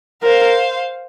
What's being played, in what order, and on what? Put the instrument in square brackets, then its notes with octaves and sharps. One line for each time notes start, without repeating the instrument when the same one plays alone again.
[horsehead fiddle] A#4 [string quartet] C5 F5